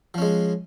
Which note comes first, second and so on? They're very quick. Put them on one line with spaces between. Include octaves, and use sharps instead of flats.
F3 C#4 G#3